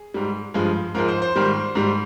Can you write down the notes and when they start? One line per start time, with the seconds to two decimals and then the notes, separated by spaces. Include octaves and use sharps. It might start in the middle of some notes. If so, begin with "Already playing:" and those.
Already playing: G#4
0.14 G#2 G3
0.54 G2 F3 G#3
0.94 G#2 F3 G#3 A#4
1.08 C5
1.22 C5
1.36 G#2 D#3 G3
1.75 G#2 G3